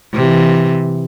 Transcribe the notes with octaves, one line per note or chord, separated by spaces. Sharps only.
C3 E3